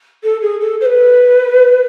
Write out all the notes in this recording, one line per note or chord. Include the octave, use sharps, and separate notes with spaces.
A4
G#4
A4
C5
B4